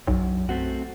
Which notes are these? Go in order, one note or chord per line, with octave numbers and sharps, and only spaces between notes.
B1 F#2
A3 C4 F#4